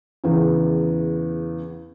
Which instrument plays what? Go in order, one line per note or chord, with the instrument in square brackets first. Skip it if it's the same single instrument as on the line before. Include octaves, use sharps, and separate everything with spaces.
[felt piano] E2 C#3